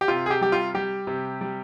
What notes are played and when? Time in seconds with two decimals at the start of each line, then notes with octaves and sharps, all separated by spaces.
0.01 G4
0.08 C3 F4
0.26 G#4
0.30 G4
0.41 G3 G4
0.52 F4
0.74 G3 G4
1.07 C3
1.41 G3